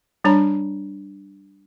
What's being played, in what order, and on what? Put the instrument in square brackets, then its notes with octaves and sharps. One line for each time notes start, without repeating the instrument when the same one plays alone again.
[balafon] G3 D4 C#5 A#5 B5